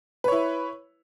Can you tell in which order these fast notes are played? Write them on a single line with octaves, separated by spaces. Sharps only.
B4 C#5 E4